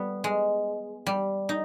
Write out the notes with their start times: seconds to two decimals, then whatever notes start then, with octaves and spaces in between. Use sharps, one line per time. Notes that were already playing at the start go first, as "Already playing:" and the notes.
Already playing: G3 B3
0.24 G#3
1.07 G3
1.49 D#4